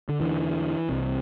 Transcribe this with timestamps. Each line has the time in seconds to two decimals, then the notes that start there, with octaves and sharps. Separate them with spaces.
0.09 D3
0.20 E2 D3 E3
0.89 C2 C3